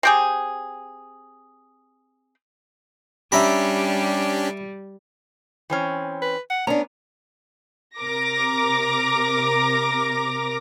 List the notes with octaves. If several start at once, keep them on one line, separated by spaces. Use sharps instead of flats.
C4 G4 G#4
G3 C#4 D4 G4 E5 A#5 B5
E3 C4 C#4
B4
F#5
B3 C#4 D4 A#5
C3 A#4 D6 A#6